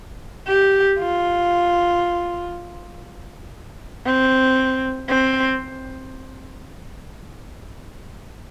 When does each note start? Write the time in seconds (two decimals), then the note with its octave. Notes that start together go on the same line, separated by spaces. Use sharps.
0.48 G4
0.99 F4
4.06 C4
5.09 C4